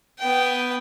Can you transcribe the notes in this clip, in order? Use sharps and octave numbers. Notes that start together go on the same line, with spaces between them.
B3 G5